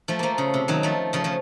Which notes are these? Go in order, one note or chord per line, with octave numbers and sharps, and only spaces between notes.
F3 A3
F3 A3 A#3
C#3
C3
D#3 F#3
F3 A3
C#3 F3
C#3 F3